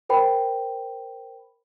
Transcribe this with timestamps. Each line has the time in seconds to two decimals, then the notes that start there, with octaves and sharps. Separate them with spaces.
0.09 A#4 C5 G5 B5